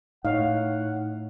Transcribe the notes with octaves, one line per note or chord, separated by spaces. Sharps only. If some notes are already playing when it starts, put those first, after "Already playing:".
A2 D#4 C#5 F5 F#5